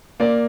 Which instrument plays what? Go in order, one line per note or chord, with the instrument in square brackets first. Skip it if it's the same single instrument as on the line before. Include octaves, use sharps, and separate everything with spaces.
[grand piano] A#3 D5